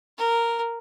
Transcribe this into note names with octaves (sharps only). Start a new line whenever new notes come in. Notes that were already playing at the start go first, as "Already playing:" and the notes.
A#4